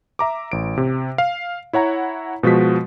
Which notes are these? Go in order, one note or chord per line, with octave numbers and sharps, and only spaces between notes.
E5 A#5 D6
A1 D7
C3
F5
E4 C#5 F#5 A#5
B2 F3 G#3 F#4 B6